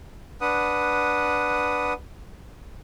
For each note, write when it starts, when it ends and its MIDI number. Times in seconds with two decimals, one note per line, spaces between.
0.41 1.93 62
0.41 1.93 71
0.41 1.93 78
0.41 1.93 87